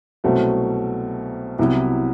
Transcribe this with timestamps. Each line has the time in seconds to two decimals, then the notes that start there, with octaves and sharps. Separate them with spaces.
0.24 C2 B2 F#3 A3 C4
1.59 C2 C3 F#3 B3 E4